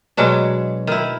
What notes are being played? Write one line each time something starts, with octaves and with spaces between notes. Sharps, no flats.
B2 F#3 G#3 D4
D#3 E4